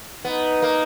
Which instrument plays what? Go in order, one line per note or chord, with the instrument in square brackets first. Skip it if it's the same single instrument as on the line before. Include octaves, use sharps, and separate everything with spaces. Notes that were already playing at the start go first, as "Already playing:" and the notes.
[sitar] B3 [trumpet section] D#4
[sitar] A#3